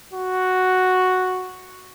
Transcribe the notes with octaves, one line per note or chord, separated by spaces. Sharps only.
F#4